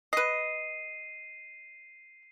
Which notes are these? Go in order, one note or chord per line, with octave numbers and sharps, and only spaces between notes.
B4 D#5 C7 D#7